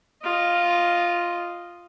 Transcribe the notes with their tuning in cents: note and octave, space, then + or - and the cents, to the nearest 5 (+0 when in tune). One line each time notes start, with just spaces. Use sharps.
F4 +0 D#5 +0